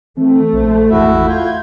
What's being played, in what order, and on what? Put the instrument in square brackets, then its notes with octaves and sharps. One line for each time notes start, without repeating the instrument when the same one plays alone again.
[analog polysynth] E3 C4 [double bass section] A3
[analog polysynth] A#1 C5
[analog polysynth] G#1 E2 [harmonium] E4 F#4 E5
[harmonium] F4 [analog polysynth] G6 G#6